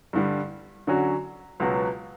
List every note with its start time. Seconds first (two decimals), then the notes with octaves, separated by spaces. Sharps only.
0.13 G2 D3 G3
0.87 D3 F#3 C#4 F#4
1.60 C#2 B2 F#3 B3 F#4